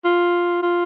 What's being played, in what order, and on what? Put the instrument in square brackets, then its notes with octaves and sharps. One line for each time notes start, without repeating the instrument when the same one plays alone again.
[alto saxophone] F4
F4